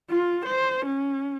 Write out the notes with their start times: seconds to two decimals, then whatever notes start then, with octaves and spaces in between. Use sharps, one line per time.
0.10 F4
0.46 C5
0.86 C#4